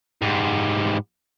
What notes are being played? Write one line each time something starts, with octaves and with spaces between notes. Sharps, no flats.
G#2 G3